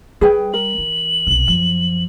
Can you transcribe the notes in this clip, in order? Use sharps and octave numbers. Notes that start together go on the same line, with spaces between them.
G3 G#4 B4 G5
A#4 F#7
E3
B1 C3
F#2 F3